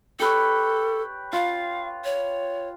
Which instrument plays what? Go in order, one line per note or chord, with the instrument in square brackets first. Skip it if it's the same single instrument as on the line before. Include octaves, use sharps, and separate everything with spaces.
[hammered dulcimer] G4 B4 C#5 [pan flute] A4
[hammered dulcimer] F4 [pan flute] F5
[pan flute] C#5